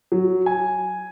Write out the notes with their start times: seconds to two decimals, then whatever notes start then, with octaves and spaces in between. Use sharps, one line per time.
0.12 F#3
0.46 G#5